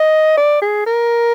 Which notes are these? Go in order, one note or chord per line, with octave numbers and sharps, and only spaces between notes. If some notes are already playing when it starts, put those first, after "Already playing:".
Already playing: D#5
D5
G#4
A#4